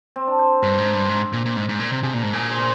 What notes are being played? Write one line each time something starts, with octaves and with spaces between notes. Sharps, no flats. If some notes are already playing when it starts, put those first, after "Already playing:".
C4
D4
C5
G2 A#4
G#2
G2
G#2
A#2
A#2
G#2
G#2
A#2
C3
C3 G#4
A#2
G#2 A#4
A#2 G#4
C5